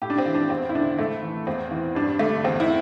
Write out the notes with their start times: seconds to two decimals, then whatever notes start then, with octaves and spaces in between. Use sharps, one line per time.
0.02 A2 G4
0.10 D4
0.18 C4
0.26 E3
0.34 D4
0.50 E2 C4
0.69 E4
0.75 D3 D4
0.99 A2 A3
1.22 E3
1.47 E2 C4
1.71 E3
1.95 G2 D4
2.19 D3 A3
2.44 E2 C4
2.60 E4